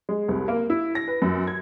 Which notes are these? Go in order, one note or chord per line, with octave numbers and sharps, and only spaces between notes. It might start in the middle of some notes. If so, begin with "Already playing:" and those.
G#3
C2
A#3
E4
A#6
B4
F#2
G#6